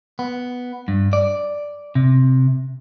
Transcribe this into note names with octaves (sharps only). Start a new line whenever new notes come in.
B3
G2
D5
C3